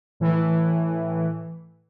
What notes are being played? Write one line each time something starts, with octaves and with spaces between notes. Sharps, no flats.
A2 E3